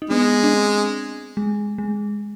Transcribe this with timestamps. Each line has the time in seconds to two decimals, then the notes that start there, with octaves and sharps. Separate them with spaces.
0.02 D#4
0.10 G#3 B3 D4
0.43 D4
0.53 C4
1.37 G#3
1.78 G#3